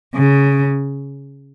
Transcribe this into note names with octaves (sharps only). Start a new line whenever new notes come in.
C#3